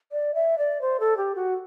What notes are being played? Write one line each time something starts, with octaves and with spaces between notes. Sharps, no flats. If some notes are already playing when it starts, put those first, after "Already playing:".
D5
E5
D5
C5
A4
G4
F#4